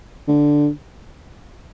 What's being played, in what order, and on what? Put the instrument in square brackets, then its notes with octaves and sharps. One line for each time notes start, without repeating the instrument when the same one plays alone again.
[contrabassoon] D3